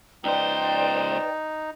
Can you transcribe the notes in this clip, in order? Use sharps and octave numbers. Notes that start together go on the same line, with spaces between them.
C#2 D#4 B4 C5 D5 G5